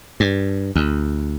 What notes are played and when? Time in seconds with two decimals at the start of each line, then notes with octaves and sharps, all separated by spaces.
0.20 G2
0.76 D2